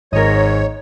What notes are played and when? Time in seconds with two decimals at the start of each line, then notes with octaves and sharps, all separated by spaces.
0.13 G#1 G#2 A#4 C#5 D#5